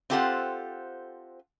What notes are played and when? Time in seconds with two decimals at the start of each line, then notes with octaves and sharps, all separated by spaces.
0.10 C4 F4 G4 A4 C5 F#5